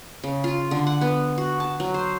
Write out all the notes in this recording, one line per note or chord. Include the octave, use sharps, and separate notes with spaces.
C#3
F4
D3
F#5
B3
F#4
A5
F#3
C5